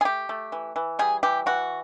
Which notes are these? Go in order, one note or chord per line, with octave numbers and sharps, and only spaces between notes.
G#4
A3 G4
A3
E3
E3
G3 G#4
E3 G4
E3 F#4